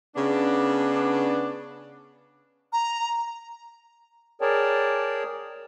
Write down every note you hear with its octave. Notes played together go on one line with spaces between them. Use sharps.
C#3 B3 D4
A#5
G#4 A#4 C#5 D5 G5 A5